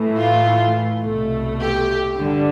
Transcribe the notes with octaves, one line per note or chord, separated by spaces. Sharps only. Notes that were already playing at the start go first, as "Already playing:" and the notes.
Already playing: A2 E3 A3
F4
C2 B2 A3
G4
G2 D3 G3